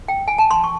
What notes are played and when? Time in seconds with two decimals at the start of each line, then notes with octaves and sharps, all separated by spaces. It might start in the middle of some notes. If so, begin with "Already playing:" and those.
0.08 G5
0.28 G#5
0.38 A5
0.51 C6
0.64 C#6